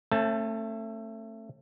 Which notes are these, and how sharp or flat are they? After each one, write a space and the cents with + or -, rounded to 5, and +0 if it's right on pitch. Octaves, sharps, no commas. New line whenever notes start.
A3 +20 C#4 -40 A5 +0